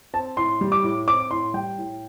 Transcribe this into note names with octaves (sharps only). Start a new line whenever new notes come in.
C4 A5
A2 C6
G3
D6
A2
C4 D6
A2 C6
G3 G5
A2